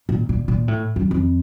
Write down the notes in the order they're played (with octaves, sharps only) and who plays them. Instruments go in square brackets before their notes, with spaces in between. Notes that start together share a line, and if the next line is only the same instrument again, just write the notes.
[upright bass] A#2
A#2
A#2
A2
F#2
F2